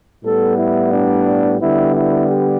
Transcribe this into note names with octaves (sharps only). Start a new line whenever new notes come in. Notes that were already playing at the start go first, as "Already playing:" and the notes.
A2 G3 B3 A4
E4
D4
D3 G3 B3 E4
E4
G4